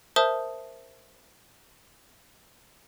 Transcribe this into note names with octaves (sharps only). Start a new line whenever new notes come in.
A#4 C5 E5 A5 D#6 G6